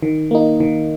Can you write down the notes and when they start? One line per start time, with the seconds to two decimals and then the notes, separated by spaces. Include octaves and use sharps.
0.03 D#3
0.31 A#3 D#4
0.60 D#3